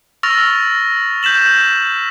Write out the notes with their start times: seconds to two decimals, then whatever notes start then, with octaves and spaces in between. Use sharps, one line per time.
0.23 C#6 E6 F6 A6 A#6 F7
1.23 G6 B6 E7 F#7